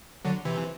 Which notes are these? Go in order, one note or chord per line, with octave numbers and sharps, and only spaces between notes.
D3 F#3
C3 E3